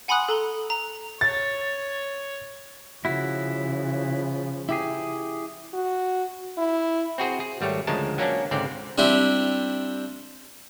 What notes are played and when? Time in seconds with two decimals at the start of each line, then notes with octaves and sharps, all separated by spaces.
0.08 F#5 G#5 B5 C6 D#6 F#6
0.29 A4 A#5 G7
0.70 A#5
1.21 C#5 A6
3.05 C#3 F3 E4 F#4
4.69 E4 G4 G#4
5.73 F#4
6.57 E4
7.18 C4 F#4 G#4 C5
7.40 G#4
7.61 G#1 G3 A3 C#5
7.87 D2 C#3 F3 G#3 A#4 A5
8.18 F#3 A#3 C#4 D4
8.51 C#2 G#2 D3 C4 D5
8.98 G3 C4 D4 E4 G4